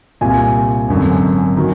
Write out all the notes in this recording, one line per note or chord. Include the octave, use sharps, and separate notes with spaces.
C2 A#2 G3 G#5
G#1 F#2 D3
D#3 F#3